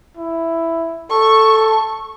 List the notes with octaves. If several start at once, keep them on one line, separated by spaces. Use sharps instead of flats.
E4
A4 C#6